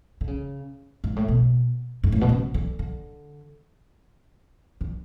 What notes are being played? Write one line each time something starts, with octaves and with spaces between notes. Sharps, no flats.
D3
C#3
G#2
A2
B2
G#2
A2
B2
C#3
D3
D3
D3